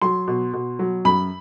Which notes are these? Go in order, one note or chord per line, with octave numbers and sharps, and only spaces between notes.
F#3 C6
B2
B2
F#3
F#2 B5